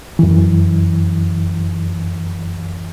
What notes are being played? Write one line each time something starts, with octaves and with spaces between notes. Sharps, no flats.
F#2 E3